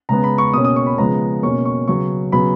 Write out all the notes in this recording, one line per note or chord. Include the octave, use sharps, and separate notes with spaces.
C#3 G#3 B3 A#5
B5
C#6
B2 A#3 C#4 D#6
D#6
C#6
B5
C#3 F3 G#3 B3 A#5
B2 A#3 C#4 C#6
C#6
C#3 F#3 B3 C#6
C#3 F#3 B3 B5